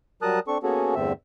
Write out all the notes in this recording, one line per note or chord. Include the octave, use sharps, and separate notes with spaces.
F#3 G3 A#4 A5 D#6 F#6
C4 D4 A4 C#6
A#3 B3 C#4 F#4 G#4 A4
E2 G2 D3 A3 C4 E5